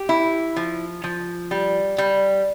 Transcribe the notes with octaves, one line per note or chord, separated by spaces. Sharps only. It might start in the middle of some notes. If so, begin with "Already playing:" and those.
Already playing: G4
E4
F3
F3
G3
G3